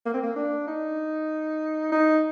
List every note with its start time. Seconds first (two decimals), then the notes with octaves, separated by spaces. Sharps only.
0.06 A#3
0.14 C4
0.23 A#3
0.36 D4
0.67 D#4
1.92 D#4